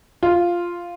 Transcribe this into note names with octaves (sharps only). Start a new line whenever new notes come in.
F4